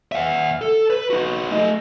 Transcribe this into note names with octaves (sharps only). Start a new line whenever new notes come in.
E5 F#5
A4
B4
D#4 F#4
A3 D#5